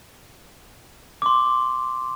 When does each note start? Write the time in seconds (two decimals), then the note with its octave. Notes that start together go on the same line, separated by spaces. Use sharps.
1.22 C6 D6